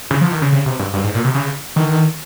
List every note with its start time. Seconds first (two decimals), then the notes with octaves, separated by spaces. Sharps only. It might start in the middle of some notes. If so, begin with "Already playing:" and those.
0.11 C#3
0.21 F3
0.31 D#3
0.42 C#3
0.52 C#3
0.66 C3
0.79 G2
0.93 G2
1.04 G#2
1.14 A#2
1.24 C3
1.35 C#3
1.76 D#3